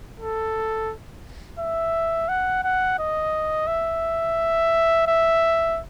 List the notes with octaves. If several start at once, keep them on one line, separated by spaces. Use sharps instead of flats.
A4
E5
F#5
F#5
D#5
E5
E5